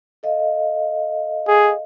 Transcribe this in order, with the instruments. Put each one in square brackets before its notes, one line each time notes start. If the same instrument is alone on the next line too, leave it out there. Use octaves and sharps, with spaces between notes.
[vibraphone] A4 D#5 F5
[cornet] G#4